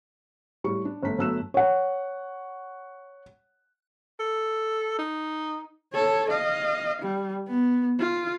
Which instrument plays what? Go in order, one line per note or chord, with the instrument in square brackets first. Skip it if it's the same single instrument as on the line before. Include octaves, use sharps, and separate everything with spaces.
[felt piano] A2 G3 C#6
D4
G1 A3 B6
G1 F#3 A3 E6 F#6 E7
C#5 F#5
[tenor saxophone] A4
D#4
[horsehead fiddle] A4 C#5
D#5 F5
G3
B3
F4